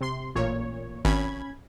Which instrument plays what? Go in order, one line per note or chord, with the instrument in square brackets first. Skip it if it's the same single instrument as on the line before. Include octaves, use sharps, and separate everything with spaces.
[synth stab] C3 C6
A1 A#2 C#5
[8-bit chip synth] G#1 [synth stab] C#4 B5 G#6